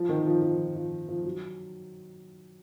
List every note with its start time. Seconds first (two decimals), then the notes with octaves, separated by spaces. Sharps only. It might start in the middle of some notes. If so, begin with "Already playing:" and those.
Already playing: F3
0.09 D#3
0.27 F3
0.42 F3
0.76 F3
1.08 F3
1.25 F#3